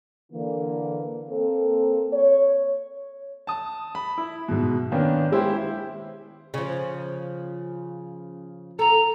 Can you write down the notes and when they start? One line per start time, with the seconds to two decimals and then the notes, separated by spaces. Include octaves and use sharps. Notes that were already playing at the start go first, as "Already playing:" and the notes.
0.32 D3 E3 A#3
1.28 A#3 C4 A4
2.13 C#5
3.47 A5 D#6
3.95 B5
4.18 E4
4.48 G#2 B2
4.92 D#3 A#3 B3 C#4 D4
5.32 G#3 E4 G4 C5
6.54 C#3 F3
8.79 A4 A#5